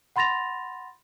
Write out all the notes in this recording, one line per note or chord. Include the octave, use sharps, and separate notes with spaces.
F#5 B5 C6 A6 A#6 F7